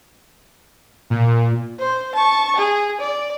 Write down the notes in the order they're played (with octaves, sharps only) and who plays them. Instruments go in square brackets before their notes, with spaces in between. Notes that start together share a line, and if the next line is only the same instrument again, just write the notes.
[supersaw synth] A#2
[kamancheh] C5
A5 C#6
G#4
D5